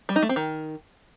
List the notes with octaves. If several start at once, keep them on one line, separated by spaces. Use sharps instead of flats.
G3
D#4
A3
C4
D#3